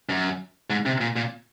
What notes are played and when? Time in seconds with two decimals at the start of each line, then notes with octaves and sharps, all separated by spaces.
0.09 F#2
0.70 G#2
0.86 C3
1.01 A#2
1.16 A#2